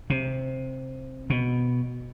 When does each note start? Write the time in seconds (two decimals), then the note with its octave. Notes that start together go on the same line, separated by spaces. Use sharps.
0.10 C3
1.30 B2